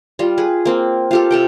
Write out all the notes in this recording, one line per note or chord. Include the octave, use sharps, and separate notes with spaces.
G3 F4
G#4 B4
A#3 C4
F4 G4 A4
C3 A4 G5